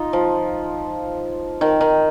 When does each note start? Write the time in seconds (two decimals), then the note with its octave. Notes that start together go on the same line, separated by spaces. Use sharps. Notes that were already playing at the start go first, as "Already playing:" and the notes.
Already playing: D#4 F4
0.13 F3
1.61 D#3
1.81 D#3